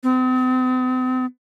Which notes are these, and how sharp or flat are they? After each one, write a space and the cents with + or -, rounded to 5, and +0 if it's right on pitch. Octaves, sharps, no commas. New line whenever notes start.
C4 -45